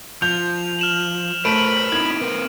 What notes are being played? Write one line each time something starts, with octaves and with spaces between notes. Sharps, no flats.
F3 G6 F7
F6 E7 F#7
A3 A4 A#4 C5 B5 D7 D#7
C4 D#4 E4 G#6
C4 A#4 B4